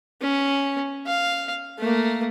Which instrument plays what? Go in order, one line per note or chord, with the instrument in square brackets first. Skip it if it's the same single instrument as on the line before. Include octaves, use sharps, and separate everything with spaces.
[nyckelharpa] C#4
F5
A3 A#3